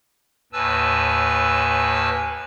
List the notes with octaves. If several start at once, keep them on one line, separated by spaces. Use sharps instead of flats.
D#2 A2 B4 G#5 A5 E6